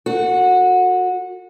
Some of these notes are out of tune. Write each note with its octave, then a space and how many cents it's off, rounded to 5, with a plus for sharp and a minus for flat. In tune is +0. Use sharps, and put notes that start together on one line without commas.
F#4 -20 A4 +40